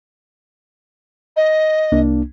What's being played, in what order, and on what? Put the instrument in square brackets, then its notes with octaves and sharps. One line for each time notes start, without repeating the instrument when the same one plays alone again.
[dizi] D#5
[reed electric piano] C2 A#3 D4